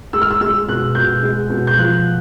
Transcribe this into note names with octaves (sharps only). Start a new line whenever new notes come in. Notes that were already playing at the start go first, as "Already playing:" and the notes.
G#3 E6
F6
E6
G#3 E6
B2 F#6
B2 G6
G#3
B2
G6
F3 F#6